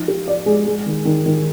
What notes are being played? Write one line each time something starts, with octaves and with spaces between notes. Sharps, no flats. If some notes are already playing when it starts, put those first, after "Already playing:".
Already playing: F3 D#4
G4
D5
G#3
G#3
D#3
D#3
D#3